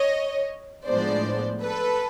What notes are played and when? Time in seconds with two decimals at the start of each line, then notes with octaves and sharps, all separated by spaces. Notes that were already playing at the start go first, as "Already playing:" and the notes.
Already playing: C#5 D#5
0.86 A2 F3 G#3 B3 D4 C5 D5
1.62 A4 B4